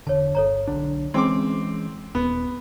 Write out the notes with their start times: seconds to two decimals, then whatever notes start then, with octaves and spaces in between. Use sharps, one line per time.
0.07 E1 D3 C#5 A5
0.35 G1 A4 C#5 A#5
0.67 B1 D3 D4
1.14 E3 G#3 C4 C#4 D#4 G#4 C6 D6
2.15 D#1 B3